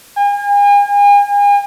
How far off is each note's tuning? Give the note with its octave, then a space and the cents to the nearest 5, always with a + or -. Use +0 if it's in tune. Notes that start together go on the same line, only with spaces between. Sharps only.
G#5 -40